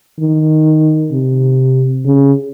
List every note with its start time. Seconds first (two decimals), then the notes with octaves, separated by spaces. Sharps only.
0.20 D#3
1.12 C3
2.05 C#3